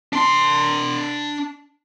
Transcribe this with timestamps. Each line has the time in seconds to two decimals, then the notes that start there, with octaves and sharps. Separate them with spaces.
0.13 D4 C6